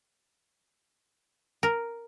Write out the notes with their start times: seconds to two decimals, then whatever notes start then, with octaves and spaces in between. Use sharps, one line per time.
1.63 A#4